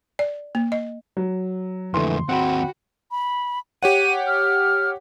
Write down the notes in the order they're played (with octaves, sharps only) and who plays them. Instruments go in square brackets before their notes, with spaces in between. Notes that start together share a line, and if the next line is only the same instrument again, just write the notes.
[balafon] D5
A#3
D#5
[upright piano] F#3
[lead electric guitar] F2 D3 [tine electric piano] E3 A3 [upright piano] C6
[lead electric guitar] D#2 C4 [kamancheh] F#4 [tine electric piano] F#5 G5 B5
[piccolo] B5
[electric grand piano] G4 C#5 F#5 [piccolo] D#7
[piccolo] F6